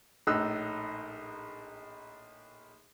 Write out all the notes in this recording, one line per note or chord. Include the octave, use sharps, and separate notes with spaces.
A#1 A2 D#4 E6 F#6